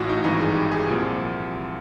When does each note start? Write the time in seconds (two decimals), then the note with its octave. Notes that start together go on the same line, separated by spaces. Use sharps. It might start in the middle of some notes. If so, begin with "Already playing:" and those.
Already playing: A1 A2 E3 F4 F#4
0.09 D#4
0.24 G#1 G2 E3 D#4
0.40 G#4
0.55 G4
0.72 G#4
0.87 C2 A#2 F3